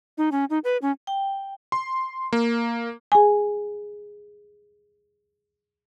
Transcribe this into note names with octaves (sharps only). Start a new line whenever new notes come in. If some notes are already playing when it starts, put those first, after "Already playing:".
D#4
C#4
D#4
B4
C#4
G5
C6
A#3
G#4 G#5